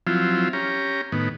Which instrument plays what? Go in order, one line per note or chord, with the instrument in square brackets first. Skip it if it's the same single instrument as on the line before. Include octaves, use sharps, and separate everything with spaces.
[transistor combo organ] F3 F#3 C4 E4 F4
C#4 G4 A#5
A2 D#3 B3